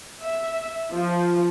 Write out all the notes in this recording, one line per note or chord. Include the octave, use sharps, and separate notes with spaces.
E5
F3